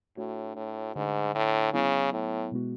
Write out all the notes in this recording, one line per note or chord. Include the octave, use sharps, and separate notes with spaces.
A2 A3 D4 F#4 C#5
A2
G#2 D3 A3 D4
A2
C#3 F#3 B3 E4
A2
B2 G#3 B3 F#4